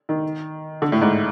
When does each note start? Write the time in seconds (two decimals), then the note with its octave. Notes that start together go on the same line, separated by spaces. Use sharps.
0.09 D#3
0.82 D3
0.92 A2
1.01 G#2